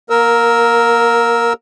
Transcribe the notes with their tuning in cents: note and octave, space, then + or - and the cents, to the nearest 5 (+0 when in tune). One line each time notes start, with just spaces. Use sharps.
A#3 +25 A#4 +0 E6 -15